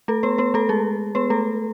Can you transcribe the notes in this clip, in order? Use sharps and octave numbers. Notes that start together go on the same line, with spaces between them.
A3 A4
B3 B4
B3 B4
A3 A4
G#3 G#4
B3 B4
A3 A4